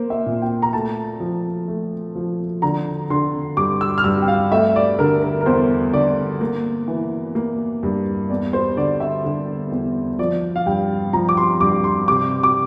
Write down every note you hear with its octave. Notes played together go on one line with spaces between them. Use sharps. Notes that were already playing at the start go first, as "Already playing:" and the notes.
Already playing: A#3 A#4 C5
E5
A#2
G5
A#5
A3 A5
F3
A3
F3
D3 A#5
D3 C6
G2 D6
E6
F6
G2 E6
G5
F5
A3 E5
D5
D3 A#4
A#4
A#4
E2 C5
D3 D5
A#3
E3
A#3
G2
E2 D5
C5
D3 D5
E5
D3
E2
F3 D5
F5
G2 G5
F3 A#5
D6
C6
G2 D6
C6
C3 D6
D6